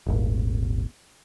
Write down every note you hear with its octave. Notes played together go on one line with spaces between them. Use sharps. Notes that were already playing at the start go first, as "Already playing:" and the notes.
D#1 G#1